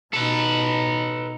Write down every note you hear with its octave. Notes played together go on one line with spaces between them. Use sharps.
B2 D#4 A4 B4